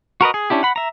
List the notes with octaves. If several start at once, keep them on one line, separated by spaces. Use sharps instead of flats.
F#4 A#4 B4 D#5
G#4
C#4 D4 E4 G4
F#5 B5
E5 A#5